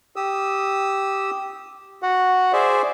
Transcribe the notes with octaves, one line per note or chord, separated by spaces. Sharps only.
G4 D#6 E6
F#4 F#5
G#4 C5 D5 E5